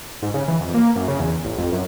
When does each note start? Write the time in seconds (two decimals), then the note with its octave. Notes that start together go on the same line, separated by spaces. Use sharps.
0.22 G#2
0.34 C#3
0.48 E3
0.60 F2
0.74 A#3
0.96 F#2
1.08 C#3
1.20 E2
1.44 A1
1.58 F2
1.72 F#2